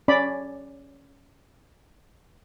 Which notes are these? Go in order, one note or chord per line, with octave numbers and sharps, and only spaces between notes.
C#4 D5 B5